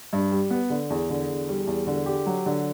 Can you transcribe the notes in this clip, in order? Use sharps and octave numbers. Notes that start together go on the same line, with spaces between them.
G2
G3
B3
D3
E2
D3
E2
G3
E2
D3
G4
F#3
D3